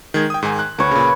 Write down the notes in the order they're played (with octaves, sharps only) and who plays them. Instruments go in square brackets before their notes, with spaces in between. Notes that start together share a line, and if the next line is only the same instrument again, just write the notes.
[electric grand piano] D#3 G#3 G#6
G5 D#6
G#2 D#3 G#5
F#6
[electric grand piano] D2 [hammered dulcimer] B4 C#5
[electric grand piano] A#2 C#3